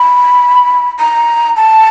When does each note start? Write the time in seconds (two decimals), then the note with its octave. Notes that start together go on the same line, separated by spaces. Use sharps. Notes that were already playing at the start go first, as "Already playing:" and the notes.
Already playing: B5
1.00 A#5
1.57 A5